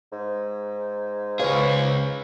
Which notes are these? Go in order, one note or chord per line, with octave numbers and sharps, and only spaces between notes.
G#2
C#2 G#4 B4 C#5 F5